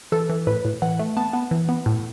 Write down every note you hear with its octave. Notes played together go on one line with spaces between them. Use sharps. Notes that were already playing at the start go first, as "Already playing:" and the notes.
E3 A4
E3
A2 B4
A2
E3 F#5
A3
B3 A5
B3
E3
B3
A2